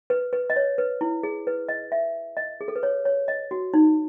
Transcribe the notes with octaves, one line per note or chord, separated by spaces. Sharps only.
B4
B4
D#5
C#5
B4
E4
G#4
B4
D#5
E5
D#5
G#4
A4
B4
C#5
C#5
D#5
F#4
D#4